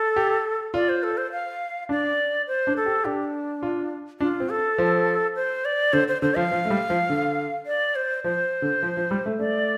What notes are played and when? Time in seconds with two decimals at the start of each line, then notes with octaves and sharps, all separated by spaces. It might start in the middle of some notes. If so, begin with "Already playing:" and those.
Already playing: A4
0.16 G4
0.74 F4 D5
0.89 C5
1.03 A4
1.17 C5
1.32 F5
1.89 D4 D5
2.47 C5
2.67 D4
2.77 A4
2.86 G4
3.05 D4 G4
3.63 F4
4.20 D4 F4
4.40 C4
4.50 A4
4.78 F3
5.36 C5
5.65 D5
5.93 D3 C5
6.08 C5
6.22 D3 C5
6.36 F3 F5
6.51 F3
6.65 A3
6.70 G3
6.90 F3
7.10 D3
7.66 D5
7.95 C5
8.24 F3 C5
8.62 D3
8.83 F3
8.97 F3
9.11 G3
9.26 A3
9.39 A3 D5